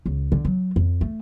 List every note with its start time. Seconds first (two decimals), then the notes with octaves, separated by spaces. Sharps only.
0.06 C#2
0.32 D3
0.45 F#3
0.76 F2
1.01 A3